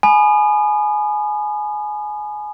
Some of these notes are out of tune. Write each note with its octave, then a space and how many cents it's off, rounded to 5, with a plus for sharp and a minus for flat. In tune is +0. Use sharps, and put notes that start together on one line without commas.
G#5 +20 B5 +0 D#6 -35